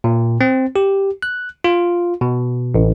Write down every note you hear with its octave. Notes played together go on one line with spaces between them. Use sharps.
A#2
C4
G4
F#6
F4
B2
A1